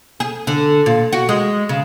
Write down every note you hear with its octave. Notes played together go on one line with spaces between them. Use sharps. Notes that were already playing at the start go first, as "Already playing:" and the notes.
G#4
D3
A#2
F#4
G#3
C#3